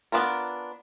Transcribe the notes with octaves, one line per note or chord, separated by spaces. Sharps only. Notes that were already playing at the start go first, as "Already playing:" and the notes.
B3 D4 F4 A#4